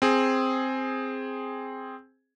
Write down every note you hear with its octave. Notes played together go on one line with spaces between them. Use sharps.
C4 G#4